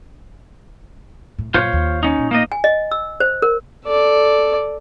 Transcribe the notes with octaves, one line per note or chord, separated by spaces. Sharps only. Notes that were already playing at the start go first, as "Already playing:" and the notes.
A2
F#2 A#2 F4 C5 C#5
D#2
C#4 D#4
A#2
A#3 D#4 D#5
G#5
D#5
E6
C5
A#4
A4 D5